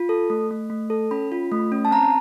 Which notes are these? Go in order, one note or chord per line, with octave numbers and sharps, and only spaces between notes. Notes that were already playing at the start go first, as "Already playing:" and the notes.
Already playing: F4
A4
A3
A3
A3
A4
C#4 B5
F4
A3
C#4
A5
C4 A#5